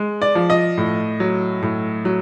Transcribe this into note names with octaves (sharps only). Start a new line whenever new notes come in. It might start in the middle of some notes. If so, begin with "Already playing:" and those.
Already playing: G#3
D5
F3
D#5
A2
F#3
A2
F#3